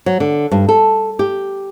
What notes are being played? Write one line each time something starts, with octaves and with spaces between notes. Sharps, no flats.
F#3
D3
G2
A4
G4